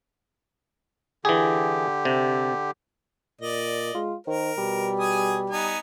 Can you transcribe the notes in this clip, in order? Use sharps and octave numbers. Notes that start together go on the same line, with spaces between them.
D3 E3 G4 G#4
C3
A#2 D5 D#5
G#3 F4
D#3 A#4 C5
B2 G3
G#4 G#5 D#6
B3 D#4 G#5